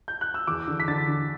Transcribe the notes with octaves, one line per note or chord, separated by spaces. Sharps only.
G6
F#6
E6
E2 D6
D3
B6
D3 A6
D3